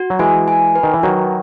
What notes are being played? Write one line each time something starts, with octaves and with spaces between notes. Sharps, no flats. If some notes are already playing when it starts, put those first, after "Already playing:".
Already playing: F#4
F#3
E3 G#3 G#5
G#5
B4
D#3
E3
D#3 F#3 F#4